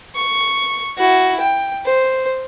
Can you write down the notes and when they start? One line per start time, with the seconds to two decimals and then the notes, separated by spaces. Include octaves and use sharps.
0.16 C#6
0.98 E4 F#4
1.40 G5
1.85 C5